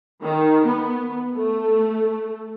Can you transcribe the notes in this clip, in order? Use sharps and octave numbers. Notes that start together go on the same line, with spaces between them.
D#3
B3
A3